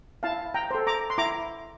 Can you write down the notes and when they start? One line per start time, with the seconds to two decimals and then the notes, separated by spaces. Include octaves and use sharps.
0.23 E4 F5 A5
0.54 G5 A#5
0.71 A4 C5
0.87 A#5 D6
1.10 C6
1.18 E4 A#5 D6